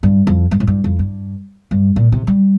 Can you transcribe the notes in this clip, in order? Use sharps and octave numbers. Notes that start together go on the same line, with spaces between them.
G2
F2
G2
A2
G2
F2
G2
G2
A#2
C3
G3